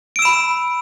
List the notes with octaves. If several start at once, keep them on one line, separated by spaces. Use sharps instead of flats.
B5 E6 D7 E7